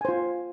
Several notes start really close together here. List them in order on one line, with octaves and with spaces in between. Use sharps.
G#5 C5 F4